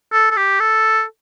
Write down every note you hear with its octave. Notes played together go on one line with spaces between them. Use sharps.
A4
A4
G4
A4